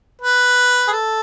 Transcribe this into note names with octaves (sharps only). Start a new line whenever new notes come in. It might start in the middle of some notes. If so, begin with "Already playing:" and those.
B4
G#4
A4